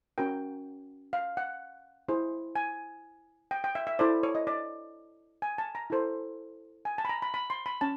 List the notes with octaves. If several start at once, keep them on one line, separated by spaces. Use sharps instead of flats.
C#4 F#4 A#4 G5
F5
F#5
E4 G#4 C5
G#5
G5
G5
E5
E5
E4 A4 C5 D5
C#5
D#5
D5
G#5
A5
A#5
E4 A4 C5
G#5
A5
B5
A#5
B5
B5
C6
B5
C#4 A5